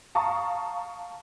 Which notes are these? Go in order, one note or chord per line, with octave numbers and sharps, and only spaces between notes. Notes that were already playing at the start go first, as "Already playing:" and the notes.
F5 A5 A#5 C#6 D#6